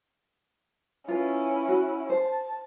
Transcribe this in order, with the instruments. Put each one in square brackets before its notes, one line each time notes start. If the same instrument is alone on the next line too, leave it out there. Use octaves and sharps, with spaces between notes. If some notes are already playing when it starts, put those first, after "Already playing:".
[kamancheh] C#4 E4 [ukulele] F4 B4
[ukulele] F#4
[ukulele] C5 [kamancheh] A5